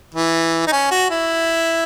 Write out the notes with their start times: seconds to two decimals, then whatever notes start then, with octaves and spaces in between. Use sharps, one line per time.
0.14 E3
0.67 D#4
0.72 C#4
0.91 F#4
1.11 E4